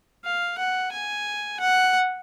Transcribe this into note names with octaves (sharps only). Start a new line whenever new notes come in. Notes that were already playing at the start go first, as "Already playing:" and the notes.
F5
F#5
G#5
F#5